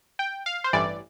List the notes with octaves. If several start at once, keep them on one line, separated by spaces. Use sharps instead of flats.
G5
F5
C5
A1 G2 E3 D5